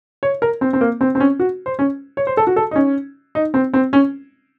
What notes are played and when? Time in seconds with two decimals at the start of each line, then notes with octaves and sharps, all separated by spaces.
0.23 C#5
0.42 A#4
0.61 C4
0.73 C4
0.81 A#3
1.01 C4
1.15 C4
1.20 C#4
1.40 F#4
1.66 C5
1.79 C#4
2.17 C#5
2.27 C5
2.37 A4
2.47 F#4
2.56 A4
2.71 D#4
2.75 C#4
3.35 D#4
3.54 C4
3.74 C4
3.93 C#4